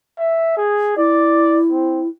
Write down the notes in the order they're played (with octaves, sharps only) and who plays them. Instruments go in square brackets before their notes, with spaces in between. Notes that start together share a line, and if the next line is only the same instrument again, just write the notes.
[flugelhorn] E5
G#4
[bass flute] E4 [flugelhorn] D5
[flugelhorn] C4